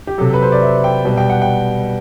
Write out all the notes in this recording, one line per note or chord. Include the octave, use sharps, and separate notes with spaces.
G4
C3 F#3 A4
B4
C5
D5
E5
G5
B2 G3
G5
F#5
G5